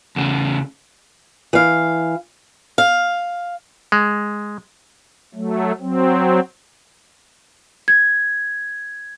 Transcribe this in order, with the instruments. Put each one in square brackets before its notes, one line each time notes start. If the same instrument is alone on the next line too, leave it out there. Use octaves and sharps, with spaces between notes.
[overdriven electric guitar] E2 C#3
[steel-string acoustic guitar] E3 F5
F5
[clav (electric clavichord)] G#3
[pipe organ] F#3 A3
F#3 C4
[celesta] G#6